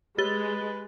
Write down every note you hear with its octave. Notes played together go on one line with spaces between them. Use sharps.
G#3 G4 B4 A6 G7